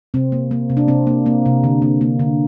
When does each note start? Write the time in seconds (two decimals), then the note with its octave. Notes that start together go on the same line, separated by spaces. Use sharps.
0.14 C3 C4
0.32 A#3
0.51 A#3
0.70 C3
0.77 D4
0.88 C3 C4
1.07 A#3
1.26 A#3
1.46 C3
1.64 D3
1.82 A#3
2.01 A#3
2.19 D3